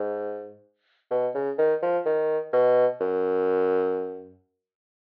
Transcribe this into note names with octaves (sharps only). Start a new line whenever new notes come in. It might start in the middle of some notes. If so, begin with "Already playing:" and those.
Already playing: G#2
B2
C#3
D#3
F3
D#3
B2
F#2